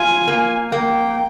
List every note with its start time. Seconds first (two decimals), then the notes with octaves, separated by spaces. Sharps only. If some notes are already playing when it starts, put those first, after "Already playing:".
Already playing: F4 G#5
0.28 A#3
0.72 A#3 G5